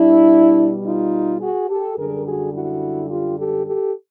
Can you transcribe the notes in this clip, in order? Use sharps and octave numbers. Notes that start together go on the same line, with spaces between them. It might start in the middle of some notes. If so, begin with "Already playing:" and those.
Already playing: B2 G3 D4 E4
D#4 F4
F#4 G#4
G4 A4
F#2 D3 G3 G#4 A#4
F#4 G#4
E4 F#4
F4 G4
G4 A4
G4 A4